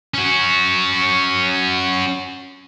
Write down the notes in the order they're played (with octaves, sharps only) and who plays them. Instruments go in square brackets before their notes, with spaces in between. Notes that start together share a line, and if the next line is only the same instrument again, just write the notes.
[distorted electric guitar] C#4 F#4